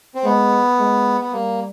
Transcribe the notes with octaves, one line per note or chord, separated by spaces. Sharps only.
C4
G#3 B3
G#3
B3
G3 A#3